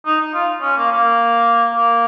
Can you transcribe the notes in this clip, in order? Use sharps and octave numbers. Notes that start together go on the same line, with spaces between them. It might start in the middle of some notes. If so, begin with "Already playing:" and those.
D#4
D#4
F4
C#4
A#3
A#3
A#3